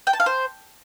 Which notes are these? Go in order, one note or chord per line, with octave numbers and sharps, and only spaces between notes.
G5
A5
F5
C5